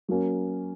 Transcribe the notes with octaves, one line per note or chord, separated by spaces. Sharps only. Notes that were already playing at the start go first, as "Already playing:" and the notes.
F#3 A#3 C#4